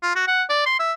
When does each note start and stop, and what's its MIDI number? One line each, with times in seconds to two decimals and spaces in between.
0.03 0.14 65
0.15 0.24 66
0.28 0.43 78
0.50 0.65 74
0.66 0.76 84
0.79 0.93 76